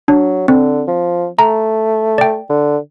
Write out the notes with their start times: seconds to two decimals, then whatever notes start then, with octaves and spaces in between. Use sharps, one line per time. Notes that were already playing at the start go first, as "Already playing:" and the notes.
0.08 F#3 D4
0.48 D3 C4
0.88 F3
1.39 A3 A#5
2.18 D5 G5
2.49 D3